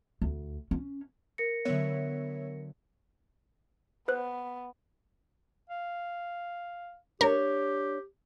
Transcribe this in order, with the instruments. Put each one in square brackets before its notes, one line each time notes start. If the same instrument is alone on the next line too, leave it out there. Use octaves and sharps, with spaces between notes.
[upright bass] D2
C#4
[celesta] A#4 A#6 C#7
[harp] D3 F#3 F#6 [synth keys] B3 C#5 E5
[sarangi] B3 [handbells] B4 C5 F#6
[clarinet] F5
[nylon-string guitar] D4 C#5 [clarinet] G4 [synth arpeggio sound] A#4